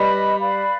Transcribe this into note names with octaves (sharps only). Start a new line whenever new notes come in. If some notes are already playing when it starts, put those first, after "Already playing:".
Already playing: G3 B4 D#5 B5
B4 D5 F5 B5